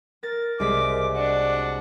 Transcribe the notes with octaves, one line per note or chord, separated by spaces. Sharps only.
A#4 A6 A#6
C2 G#3 D6 B6
D4 F#4 D5